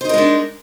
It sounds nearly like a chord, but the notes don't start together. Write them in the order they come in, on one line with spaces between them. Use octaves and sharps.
C5 D#4 A#4 G#3 D4